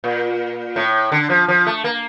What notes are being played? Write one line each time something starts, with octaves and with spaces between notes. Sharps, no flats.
A#2
A2
D3
F3
F3
A3
A#3